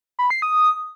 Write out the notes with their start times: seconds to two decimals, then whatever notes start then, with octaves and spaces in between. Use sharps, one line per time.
0.19 B5
0.30 C7
0.42 D#6